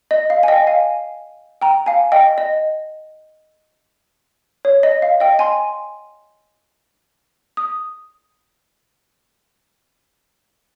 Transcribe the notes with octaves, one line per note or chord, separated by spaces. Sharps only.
D#5
F5
G#5
D#5 G5
F5 G#5
G5 A#5
F5 G#5
D#5 G5
D#5
C#5
D#5
F5
D#5 G5
G#5 C6
D#6